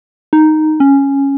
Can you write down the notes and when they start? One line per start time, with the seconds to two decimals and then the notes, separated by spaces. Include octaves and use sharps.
0.33 D#4
0.80 C#4